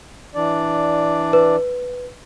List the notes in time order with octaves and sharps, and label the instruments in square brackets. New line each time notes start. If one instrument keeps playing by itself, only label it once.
[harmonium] E3 D4 D5
[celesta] B4